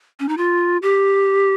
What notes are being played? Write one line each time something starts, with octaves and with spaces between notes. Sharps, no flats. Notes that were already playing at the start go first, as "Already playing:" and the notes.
C#4
D#4
F4
G4